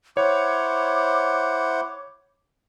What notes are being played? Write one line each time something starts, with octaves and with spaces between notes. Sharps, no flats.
E4 C5 C#5 F#5 D6